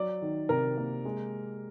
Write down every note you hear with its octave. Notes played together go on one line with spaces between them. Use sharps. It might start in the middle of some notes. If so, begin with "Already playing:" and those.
Already playing: F#3 D5
D#3
C3 A#4
A#3
G#3